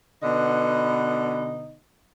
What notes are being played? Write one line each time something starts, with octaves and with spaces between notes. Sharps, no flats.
B2 D3 B3 D#4